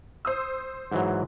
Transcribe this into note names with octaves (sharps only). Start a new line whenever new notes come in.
C5 D#6 E6
G#2 E3 F#3